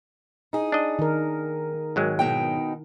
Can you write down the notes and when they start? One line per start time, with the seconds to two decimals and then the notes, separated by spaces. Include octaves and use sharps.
0.53 D#4 G#4
0.72 D4 D#5
0.99 D#3 A#4
1.96 G#1 F#3 G#3
2.19 B2 D#4 G5